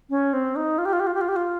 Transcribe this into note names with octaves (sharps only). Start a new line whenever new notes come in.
C#4
C4
D#4
F4
G4
F4
G4
F4
G4
F4
G4
F4